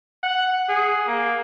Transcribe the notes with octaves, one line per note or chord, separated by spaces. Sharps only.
F#5
G#4
A#3